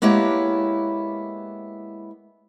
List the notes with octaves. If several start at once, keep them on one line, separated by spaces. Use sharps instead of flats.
G#3 A#3 B3 E4 G4 C#5